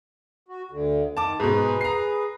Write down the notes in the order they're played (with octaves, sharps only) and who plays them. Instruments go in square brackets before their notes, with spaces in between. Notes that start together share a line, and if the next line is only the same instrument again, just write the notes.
[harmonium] F#4
D2 D3
[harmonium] D#3 [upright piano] A5 D6
[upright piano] G#2 B2 [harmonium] G#4 B4
[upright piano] A#5 C7